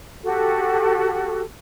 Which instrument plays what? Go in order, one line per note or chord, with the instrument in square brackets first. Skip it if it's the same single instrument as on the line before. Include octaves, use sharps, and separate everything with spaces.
[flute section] F#4 G4 A4